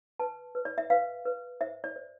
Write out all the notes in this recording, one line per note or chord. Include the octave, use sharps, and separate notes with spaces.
B4 A5
B4
D5
E5
B4 F5
B4
C5 E5
D5
C5